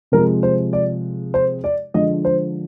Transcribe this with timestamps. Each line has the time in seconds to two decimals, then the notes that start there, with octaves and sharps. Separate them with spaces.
0.12 C3 F3 G#3 A#4
0.43 C5
0.73 D5
1.34 C5
1.64 D5
1.94 D3 F3 G#3 D#5
2.25 C5